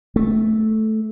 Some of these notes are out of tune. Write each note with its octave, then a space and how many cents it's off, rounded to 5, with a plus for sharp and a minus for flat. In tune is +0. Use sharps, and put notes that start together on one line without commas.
A3 -10